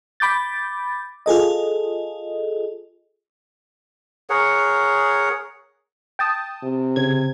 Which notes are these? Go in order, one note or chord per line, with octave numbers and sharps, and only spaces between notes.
B5 D6 G6 A6
F4 G#4 A4 D#5
G#4 A#4 C#5 F#5
G5 A5 D#6
C3
C#3 G#6